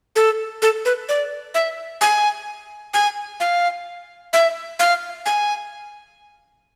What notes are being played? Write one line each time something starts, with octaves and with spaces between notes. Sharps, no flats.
A4
A4
B4
D5
E5
G#5
G#5
F5
E5
F5
G#5